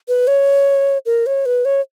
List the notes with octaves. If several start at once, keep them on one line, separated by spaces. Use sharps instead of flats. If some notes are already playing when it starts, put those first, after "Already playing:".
B4
C#5
A#4
C#5
B4
C#5